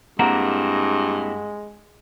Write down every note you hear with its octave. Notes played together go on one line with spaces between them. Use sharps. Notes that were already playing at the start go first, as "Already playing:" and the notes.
G2 G#3 A#3 C4 E4 F#5 A#5